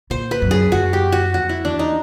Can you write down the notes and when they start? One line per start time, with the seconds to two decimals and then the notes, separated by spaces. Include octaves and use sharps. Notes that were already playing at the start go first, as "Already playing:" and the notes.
0.10 A#2 C5
0.31 B4
0.42 F#2
0.51 G#4
0.72 F#2 F#4
0.93 G4
1.12 F#4
1.33 F2 F#4
1.49 E4
1.64 E2 D4
1.79 D#4